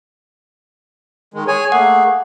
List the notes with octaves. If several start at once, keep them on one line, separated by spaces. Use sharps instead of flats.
D#3 G#3
G#4 C#5 G#5
A3 A#3 G#4 F#5